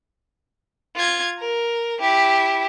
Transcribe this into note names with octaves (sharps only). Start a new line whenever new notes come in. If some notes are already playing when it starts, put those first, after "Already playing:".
F4 G#6
A#4
E4 G4